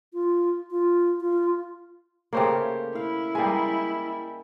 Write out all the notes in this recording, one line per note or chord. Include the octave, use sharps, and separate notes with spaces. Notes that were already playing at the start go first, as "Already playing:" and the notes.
F4
F4
F4
C#3 A3 A#3 G4 C5 C#5
E4 F5
G3 G#3 A#3 G#5